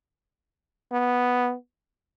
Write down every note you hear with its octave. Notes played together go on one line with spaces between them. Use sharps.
B3